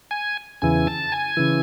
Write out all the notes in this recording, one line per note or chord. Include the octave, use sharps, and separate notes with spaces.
G#5
E2 C#3 E3 G#5
A5
G#5
C#3 E3